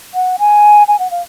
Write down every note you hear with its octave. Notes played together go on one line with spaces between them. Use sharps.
F#5
G#5
G#5
F#5
F5